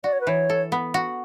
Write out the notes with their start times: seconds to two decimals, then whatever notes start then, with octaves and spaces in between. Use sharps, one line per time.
0.04 F#4 D5
0.13 C#5
0.21 B4
0.27 E3 C#5
0.50 A4
0.72 B3
0.94 F#4